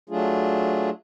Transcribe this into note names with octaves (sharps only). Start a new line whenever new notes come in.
F#3 A3 D4 F4 G#4